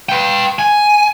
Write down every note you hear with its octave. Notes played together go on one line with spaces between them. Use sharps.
B4 G5
G#5